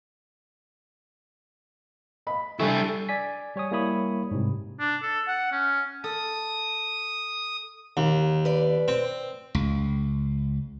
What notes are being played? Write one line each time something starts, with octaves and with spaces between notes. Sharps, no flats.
D#5 B5
G3 D4 E4 A4 G#5 C#6
D5 G#5 B6
G3 C#5 G#5 D#6
G3 A#3 E4 C#5 B5 D#6
G#2 C3
D4
A4
F#5
C#4
A4 D#6
D#2
B4 D5
C4
C#2